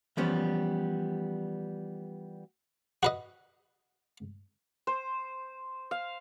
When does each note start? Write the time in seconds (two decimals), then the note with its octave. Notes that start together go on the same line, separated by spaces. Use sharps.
0.17 E3 F3 G3 B3 C#4
3.03 F#4 B4 D#5
4.87 C5
5.91 F5